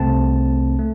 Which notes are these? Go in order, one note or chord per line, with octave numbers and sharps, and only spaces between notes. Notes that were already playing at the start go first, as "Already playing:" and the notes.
Already playing: C2 C3 A3 C4 A5
A3